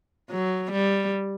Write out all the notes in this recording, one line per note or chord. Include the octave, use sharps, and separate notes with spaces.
F#3
G3